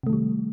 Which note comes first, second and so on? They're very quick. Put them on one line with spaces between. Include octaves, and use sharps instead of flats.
C3 A3 D#3 G3